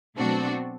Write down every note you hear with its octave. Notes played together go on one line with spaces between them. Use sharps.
B2 F#3 A3 C4 D4 F#4